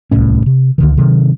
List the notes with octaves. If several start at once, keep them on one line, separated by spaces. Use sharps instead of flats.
D1 C2 A2 C#4
C3
C#2 D3 D#3
C3 D#3 F#3